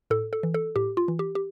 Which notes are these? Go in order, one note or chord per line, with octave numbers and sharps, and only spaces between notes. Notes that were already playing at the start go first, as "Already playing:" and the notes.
A2 A4
A4
E3
A4
A2 G4
F4
E3
G4
G4